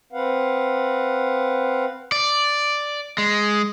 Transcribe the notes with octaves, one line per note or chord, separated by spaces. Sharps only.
C4 B4 F5 F#5
D5
G#3